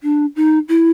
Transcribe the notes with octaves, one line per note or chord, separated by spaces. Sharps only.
D4
D#4
E4